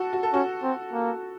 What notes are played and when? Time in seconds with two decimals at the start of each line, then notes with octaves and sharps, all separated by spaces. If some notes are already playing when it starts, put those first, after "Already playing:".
Already playing: F#4 A4
0.13 F#4
0.23 A4
0.33 C#4 F#4
0.63 C4
0.93 A#3